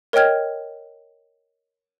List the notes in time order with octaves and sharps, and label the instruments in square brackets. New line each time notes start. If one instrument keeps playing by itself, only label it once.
[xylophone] A#4 C#5 D#5 G5 F6 G#6